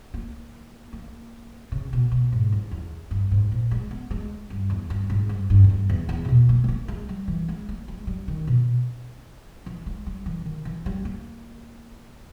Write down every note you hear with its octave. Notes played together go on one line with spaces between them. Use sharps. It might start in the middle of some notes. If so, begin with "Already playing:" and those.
A#3
A#3
C#3
B2
B2
G#2
E2
E2
G2
G#2
A#2
G#3
B3
G#3
G2
E2
G2
G#2
G2
G2
E2
G2
E2
E2
A#2
B2
A#3
G#3
A#3
G#3
G3
E3
G#3
A#3
G#3
G3
D#3
B2
E3
G#3
G3
E3
D#3
E3
G3
A#3